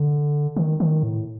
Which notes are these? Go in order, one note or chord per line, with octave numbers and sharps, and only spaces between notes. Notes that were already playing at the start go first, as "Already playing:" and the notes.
Already playing: D3
D#3
D#3
A2